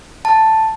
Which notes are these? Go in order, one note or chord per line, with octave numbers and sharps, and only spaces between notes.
A5